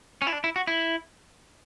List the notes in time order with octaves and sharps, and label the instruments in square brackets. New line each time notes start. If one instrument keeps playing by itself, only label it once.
[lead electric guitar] C#4
E4
D4
E4
F#4
E4